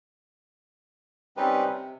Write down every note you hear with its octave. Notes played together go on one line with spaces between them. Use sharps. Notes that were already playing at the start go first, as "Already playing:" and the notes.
G3 C4 C#4 D#4 G4 B4
C3